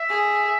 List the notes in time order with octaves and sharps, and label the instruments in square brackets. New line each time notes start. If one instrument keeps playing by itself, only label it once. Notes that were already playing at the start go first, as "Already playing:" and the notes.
Already playing: [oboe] E5
[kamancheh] G#4